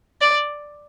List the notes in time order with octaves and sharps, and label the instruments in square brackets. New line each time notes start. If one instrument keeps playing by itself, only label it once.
[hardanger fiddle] D5